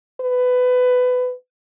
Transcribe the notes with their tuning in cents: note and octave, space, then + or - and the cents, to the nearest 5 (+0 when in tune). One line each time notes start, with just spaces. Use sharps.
B4 +20